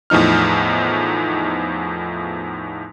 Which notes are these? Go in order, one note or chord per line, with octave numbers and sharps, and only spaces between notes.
E2 A2 F3 D#4 F6